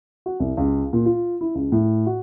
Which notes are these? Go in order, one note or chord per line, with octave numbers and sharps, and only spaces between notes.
F#4
C2
C#2
A#2
F4
E4
C#2
A2
F#4